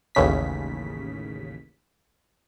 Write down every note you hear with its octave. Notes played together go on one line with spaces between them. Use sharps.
A1 D#2 C#3 B6